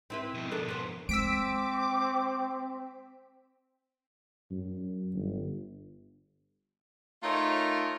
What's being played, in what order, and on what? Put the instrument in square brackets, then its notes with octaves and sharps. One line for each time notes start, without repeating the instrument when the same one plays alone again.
[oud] C4 E4 B4
[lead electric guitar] F2 B2
[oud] D4 A4 A#4
B3 C5
[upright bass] G#3 [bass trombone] C4 [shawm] D6 [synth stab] E6 B6 D7
[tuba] F#2
G1
[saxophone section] A3 D#4 F4 A#4 C#5 E5